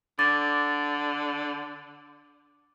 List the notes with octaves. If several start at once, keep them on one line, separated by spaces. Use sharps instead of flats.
D3 D6 A6